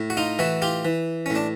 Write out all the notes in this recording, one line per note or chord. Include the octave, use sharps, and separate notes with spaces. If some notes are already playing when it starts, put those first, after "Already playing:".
Already playing: A2
F#4
D#4 F4
E3 E4 F#4
F4 G4
E3
A2 C#4
D4